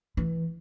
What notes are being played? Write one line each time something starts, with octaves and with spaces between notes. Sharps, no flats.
E3